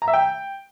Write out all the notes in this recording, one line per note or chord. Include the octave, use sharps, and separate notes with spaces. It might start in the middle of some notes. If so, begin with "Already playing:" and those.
A#5
E5
G5